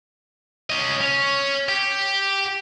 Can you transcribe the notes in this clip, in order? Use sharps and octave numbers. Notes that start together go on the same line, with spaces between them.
C#4 D#5
C#4
G4